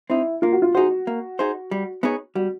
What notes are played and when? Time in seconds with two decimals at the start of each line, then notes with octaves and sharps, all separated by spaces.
0.10 C4 D#4 E4
0.42 A#3 F4
0.52 F#4
0.62 F4
0.74 D#4 F#4 G#4 C5
1.07 A#3
1.39 D#4 G#4 C5
1.71 G3
2.03 B3 D#4 G#4 C#5
2.35 G3 F#4